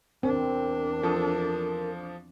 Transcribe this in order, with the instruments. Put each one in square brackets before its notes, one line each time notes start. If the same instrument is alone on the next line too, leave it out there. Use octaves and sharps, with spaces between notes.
[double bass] E2 D4 [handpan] C4 [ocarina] A#4
[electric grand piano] F3 A4 D#6